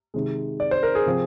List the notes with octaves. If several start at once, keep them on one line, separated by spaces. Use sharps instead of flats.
C3 D#3 G#3
D5
C5
A#4
G#4
C3 F3 C4